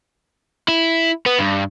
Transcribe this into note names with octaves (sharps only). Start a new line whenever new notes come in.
E4
B3
G2